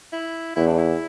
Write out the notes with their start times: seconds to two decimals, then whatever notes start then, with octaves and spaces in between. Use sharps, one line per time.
0.13 E4
0.56 E2 E4
0.67 D4
0.78 E4